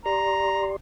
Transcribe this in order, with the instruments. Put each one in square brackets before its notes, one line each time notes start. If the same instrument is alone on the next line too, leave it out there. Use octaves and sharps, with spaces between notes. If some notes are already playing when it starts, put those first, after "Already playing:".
[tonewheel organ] G4 D5 C6 [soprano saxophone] A#5